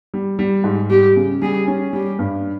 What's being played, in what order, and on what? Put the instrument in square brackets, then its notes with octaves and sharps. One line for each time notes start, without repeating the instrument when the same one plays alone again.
[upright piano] G3
G3
G#2
[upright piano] G3 [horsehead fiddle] G4
[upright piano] C#3
[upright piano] G3 [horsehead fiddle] G#4
[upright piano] C#4
[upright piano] G3 [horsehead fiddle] G4
[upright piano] G2